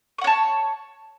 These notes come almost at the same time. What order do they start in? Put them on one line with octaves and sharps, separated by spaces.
C#6 F#5 C#5 A5